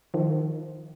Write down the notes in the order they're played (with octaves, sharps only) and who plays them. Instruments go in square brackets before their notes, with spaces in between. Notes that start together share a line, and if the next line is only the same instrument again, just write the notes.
[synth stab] D#3 F3